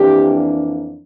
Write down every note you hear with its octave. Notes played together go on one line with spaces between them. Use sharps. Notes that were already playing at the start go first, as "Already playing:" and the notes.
Already playing: F2 E3 A#3 D4 G4